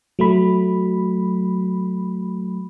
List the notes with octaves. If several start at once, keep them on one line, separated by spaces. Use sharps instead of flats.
F#3 A3 B5